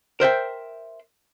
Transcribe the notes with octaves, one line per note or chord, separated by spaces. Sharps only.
A#4 C5 E5 G5